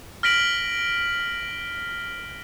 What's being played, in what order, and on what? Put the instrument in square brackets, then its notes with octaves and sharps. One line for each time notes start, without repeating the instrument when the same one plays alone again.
[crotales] F6 A#6 B6 D7 F#7 G7